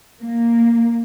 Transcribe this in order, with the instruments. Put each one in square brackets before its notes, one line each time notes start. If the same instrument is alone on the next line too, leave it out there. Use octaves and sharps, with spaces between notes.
[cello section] A#3